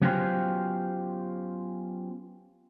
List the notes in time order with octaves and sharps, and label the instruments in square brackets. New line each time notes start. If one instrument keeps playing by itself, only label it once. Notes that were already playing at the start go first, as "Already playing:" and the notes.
[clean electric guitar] F#3 B3 C#4 F4 G4 C5